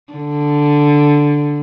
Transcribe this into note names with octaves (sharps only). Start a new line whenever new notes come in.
D3